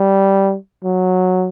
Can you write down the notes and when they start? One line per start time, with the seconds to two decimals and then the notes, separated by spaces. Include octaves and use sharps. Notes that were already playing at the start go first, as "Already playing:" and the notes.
Already playing: G3
0.84 F#3